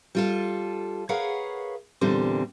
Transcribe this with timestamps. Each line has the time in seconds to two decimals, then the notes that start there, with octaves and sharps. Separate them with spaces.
0.15 G3 F4 A4
1.09 G#4 A#4 B4 C#5 F5 F#5
2.01 E2 A#2 D3 G3 C4